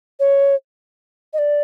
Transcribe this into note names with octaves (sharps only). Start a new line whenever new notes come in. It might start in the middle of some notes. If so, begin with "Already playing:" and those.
C#5
D#5
D5